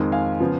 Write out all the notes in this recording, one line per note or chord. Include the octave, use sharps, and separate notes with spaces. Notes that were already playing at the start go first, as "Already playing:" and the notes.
Already playing: F2 D#3 G#3
F5 G#5
C#3 F3 B3